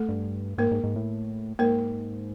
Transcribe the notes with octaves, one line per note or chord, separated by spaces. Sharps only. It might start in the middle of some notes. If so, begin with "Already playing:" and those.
Already playing: A3 A4
G2
G#2 A#3 A#4
G#2
G#2
A2
G#2 A#3 A#4